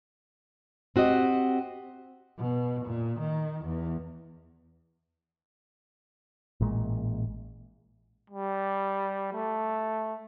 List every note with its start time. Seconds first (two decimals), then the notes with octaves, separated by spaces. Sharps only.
0.96 C4 F#4 G4 D#5
2.38 B2
2.86 A#2
3.20 D#3
3.65 E2
6.61 A1 A#2 G#3
8.30 G3
9.33 A3